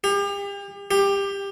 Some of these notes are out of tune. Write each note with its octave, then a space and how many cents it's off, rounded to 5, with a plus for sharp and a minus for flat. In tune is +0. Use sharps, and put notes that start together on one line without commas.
G4 +40
G4 +20